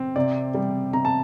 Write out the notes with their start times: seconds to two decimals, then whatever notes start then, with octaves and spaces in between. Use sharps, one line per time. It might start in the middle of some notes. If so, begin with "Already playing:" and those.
Already playing: C4
0.16 C3 D5
0.54 G3
0.93 C3 A#5
1.05 A5